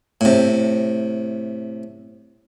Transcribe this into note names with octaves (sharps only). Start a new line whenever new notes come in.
A2 C3